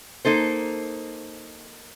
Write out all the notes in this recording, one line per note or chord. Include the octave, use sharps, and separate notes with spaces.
A#3 D#4 A4 C5